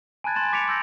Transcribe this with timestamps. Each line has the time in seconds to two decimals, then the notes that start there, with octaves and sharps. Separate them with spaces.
0.24 G#5 A5 B5 F#6 G#6 A6
0.36 G#5 C6 A6 E7
0.53 D6 B6 C#7 D7 F7
0.68 C6 E6 G6 A#6